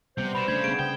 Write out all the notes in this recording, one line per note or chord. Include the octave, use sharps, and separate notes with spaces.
C3 G3 B3 C5
B2 B5 E7
C#3 A3 D4 G#6
B3 G#4 D7
C#3 G5